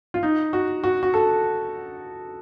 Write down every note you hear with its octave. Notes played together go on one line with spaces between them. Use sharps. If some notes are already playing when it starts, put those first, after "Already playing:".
F4
D#4
F#4
F#4
F#4
A4